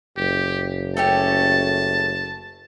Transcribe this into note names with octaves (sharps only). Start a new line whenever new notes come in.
F#1 G4
A3 C#4 G4 A5